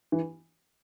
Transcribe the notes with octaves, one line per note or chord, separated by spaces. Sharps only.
E3